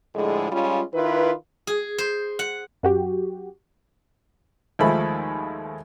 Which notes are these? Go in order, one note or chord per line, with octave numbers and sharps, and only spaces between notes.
A2 D3 F3 G#3
G3 G#3 C#4 F4
D#3 E4 F4 B4
G#4
C5
F#5
F#2 F#4 G4
D#2 F3 G#3 A3 A4 B5